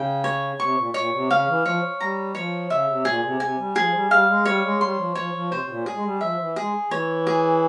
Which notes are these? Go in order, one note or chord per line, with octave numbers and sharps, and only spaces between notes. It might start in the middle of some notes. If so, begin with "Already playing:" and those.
Already playing: C#3 G5
C#5
C3 C#6
A#2
A#2 C#5
C3
C#3 F5
E3
F3 C#5
G3 A#5
F3 C#5
C#3 E5
C3
A#2 G#4
C3
C3 G#5
G3
F3 G#4
G3
G3 F5
G#3
G3 C#5
G#3
G3 C6
F3
F3 C#5
F3
C3 C5
C3
A#2
G#4
G#3
G3
F3 E5
E3
G#3 G#4
E3 C#5
G#4